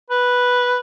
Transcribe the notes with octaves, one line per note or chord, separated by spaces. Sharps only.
B4